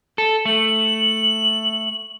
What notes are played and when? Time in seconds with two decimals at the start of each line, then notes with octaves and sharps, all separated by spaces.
0.18 A4
0.45 A3 F#7